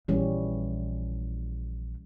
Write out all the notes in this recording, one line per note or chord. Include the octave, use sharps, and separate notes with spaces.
A#1 E3 G3 C#4